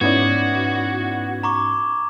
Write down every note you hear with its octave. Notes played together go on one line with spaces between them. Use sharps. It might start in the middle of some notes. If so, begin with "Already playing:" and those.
G#2 B3 C#4 D#4 E4 F#4 D5 G#6
A#5 C#6 D6